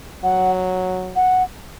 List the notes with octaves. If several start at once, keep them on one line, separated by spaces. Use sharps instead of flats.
F#3 F#5
F#5